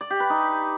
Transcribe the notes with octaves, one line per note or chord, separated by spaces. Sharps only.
D5
G4
B4
D#4